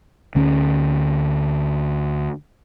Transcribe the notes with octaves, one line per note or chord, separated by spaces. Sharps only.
D2 D3 C#4